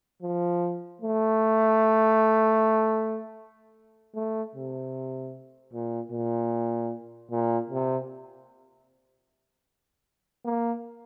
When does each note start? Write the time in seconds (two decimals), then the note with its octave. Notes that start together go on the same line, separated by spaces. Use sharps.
0.22 F3
1.01 A3
4.15 A3
4.55 C3
5.73 A#2
6.12 A#2
7.31 A#2
7.70 C3
10.45 A#3